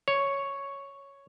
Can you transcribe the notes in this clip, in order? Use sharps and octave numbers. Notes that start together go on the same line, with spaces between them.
C#5